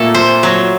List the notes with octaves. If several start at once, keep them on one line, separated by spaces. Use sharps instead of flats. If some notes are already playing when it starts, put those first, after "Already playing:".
Already playing: A#2 A3 A#3 A4
C5
F#3